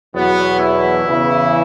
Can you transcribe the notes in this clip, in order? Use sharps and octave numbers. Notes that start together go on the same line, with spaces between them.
E2 B2 F#3 B3
E4
E2 C#3 E3